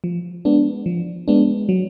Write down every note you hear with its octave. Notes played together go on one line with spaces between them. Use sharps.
F3
G#3 B3 D4
F3
G#3 B3 D4
F#3